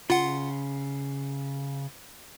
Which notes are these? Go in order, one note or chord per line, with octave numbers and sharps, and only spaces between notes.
C#3 F4 F#5 C6